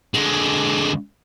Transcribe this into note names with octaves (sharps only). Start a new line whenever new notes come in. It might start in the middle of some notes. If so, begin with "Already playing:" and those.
D3 G#3